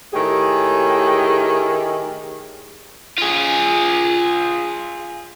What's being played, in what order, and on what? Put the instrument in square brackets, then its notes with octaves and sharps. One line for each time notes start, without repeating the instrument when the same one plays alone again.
[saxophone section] A2 D#3 G4 G#4
[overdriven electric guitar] F4 G#4